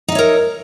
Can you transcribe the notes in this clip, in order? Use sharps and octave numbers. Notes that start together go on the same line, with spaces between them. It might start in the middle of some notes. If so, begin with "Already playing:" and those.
D#4 A#4 C#5 E5